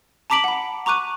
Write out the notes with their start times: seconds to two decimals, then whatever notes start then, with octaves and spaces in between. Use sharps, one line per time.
0.30 A5 A#5 D6 B6 D7 F#7
0.44 F#5 B5
0.86 A#5 C#6 D6 F#6 D#7